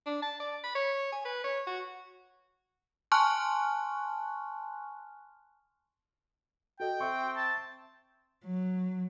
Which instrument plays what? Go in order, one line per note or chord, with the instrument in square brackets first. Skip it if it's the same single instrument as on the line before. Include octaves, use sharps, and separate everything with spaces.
[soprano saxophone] D4
A5
D5
B5
C#5
G#5
B4
C#5
F#4
[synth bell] G#5 A5 C6 C#6 F6 F#6
[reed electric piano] F#4 A4 D#5 [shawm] G5
[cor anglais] C4 [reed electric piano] E5 C#6
[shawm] A5
[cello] F#3